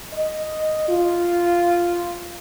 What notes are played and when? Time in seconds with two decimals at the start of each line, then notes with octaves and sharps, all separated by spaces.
0.14 D#5
0.88 F4